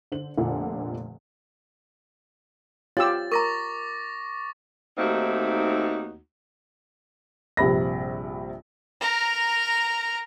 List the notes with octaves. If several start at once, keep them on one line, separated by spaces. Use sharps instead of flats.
D3 C5 F#7
F1 A#2 D3 F3 D4 F#5
F4 G4 C#5 E6 A6
A#4 A#5 C#6 D6 A#6
D#2 A3 A#3 C4 D#4 F#4
A#1 G2 C3 B5 A#6
A#4 A#5